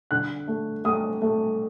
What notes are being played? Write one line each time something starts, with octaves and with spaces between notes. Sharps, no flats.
D3 F#6
A3
A3 D#6
A3